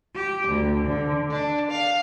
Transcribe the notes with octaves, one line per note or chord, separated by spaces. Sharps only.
G4
D2
D3
D4
F5